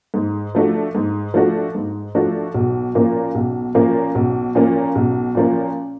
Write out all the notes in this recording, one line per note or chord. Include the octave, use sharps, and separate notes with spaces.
G#2
F3 A3 D4 F#4
G#2
F3 A3 D4 F#4
G#2
F3 A3 D4 F#4
B1
A#2 F3 A#3 C#4
B1
A#2 F3 A#3 C#4
B1
A#2 F3 A#3 C#4
B1
A#2 F3 A#3 C#4